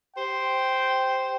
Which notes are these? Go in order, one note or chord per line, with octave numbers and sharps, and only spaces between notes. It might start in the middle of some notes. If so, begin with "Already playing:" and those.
G4 C5 G5